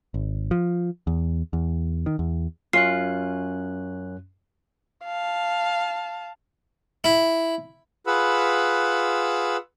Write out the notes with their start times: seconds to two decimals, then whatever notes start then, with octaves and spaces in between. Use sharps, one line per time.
0.14 G#1
0.51 F3
1.07 E2
1.53 E2
2.06 D#3
2.19 E2
2.73 F#2 C#4 F4 F#6 C7
5.05 F5 A5
7.04 E4
8.07 F4 G#4 B4 F#5 B5 E6